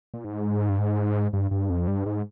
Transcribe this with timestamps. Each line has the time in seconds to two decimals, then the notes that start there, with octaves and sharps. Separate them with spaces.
0.14 A#2
0.24 G#2
0.69 G2
0.79 G#2
1.33 G2
1.51 G2
1.70 F2
1.88 G2
2.06 G#2